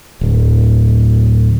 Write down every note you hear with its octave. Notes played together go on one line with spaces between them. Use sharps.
D1